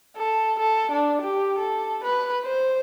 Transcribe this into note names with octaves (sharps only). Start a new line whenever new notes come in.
A4
A4
D4
G4
A4
B4
C5